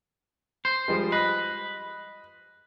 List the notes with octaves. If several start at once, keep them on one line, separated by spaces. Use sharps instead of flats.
C5
F3 G3 G#3
B4 D#5